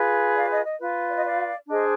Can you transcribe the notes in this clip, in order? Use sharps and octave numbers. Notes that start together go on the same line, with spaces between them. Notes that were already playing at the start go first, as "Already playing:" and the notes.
Already playing: F4 G#4 B4
D5 F5
D#5
D#5
F4 B4
D5
D#5
D5 F5
D4 G#4 C5 D#5